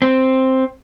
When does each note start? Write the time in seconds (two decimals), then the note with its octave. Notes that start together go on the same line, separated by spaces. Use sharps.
0.02 C4